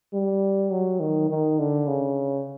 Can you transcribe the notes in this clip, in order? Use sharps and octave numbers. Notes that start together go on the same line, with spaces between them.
G3
F#3
D#3
D#3
D3
C#3